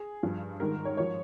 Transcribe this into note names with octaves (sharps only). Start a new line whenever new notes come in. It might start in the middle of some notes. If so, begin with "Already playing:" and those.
Already playing: G#4
G2 F3
G#2 D#3 G3 A#4
C#5
G#2 F3 C#5